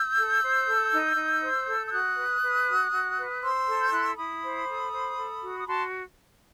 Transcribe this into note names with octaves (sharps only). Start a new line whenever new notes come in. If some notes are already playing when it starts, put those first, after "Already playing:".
Already playing: E6 G6
A4
C5
A4
D#4
D#4
C5
A4
E6
F#4 D#6 F#6
B4
B4
F#4
F#4
B4
C5 C6 E6
A4
G6
E4 F#6
E6
E4 B5 D#6
C5
A4
C5
A4
F#4
D#6
F#4 A5 C6